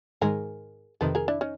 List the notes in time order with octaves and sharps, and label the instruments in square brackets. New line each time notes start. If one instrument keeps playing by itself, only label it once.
[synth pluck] G#2 D#3 G#3 [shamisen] G#4 A#4
[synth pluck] F2 C3 D#3 [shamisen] A4 B4
[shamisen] G#4 A#4
D4 E4
C#4 D#4